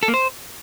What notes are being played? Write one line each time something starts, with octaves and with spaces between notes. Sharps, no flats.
A4
A#3
C5